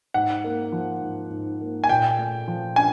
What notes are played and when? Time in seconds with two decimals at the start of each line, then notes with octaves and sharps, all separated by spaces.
0.14 G#2 F#5
0.44 A#3
0.72 F3
1.02 G#2
1.31 G#2
1.61 A#3
1.84 G#5
1.89 A#2 G5
2.18 A3
2.48 F3
2.76 D4 G#5